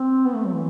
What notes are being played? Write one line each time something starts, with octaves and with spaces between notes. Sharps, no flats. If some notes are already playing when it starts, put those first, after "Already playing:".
Already playing: C4
B3
A3
F#3
E3